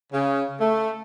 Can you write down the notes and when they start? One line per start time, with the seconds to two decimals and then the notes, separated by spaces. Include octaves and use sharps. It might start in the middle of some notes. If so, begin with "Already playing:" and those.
0.12 C#3
0.61 A3